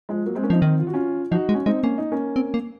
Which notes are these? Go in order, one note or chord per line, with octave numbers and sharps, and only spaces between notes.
F3 G#3
F#3 A#3
G#3 C4
A#3 C#4
F3 C4 D#4
D#3 C4 D#4
F4
F#4
C#4 F4
F3 D#4 F#4
G#3
C#4
G#3 C4 D#4
A#3 C#4
D#4
A#3 C#4
C4
A#3